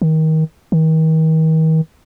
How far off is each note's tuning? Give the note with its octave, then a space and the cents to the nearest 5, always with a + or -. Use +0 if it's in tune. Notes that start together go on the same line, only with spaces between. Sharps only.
D#3 +25
D#3 +40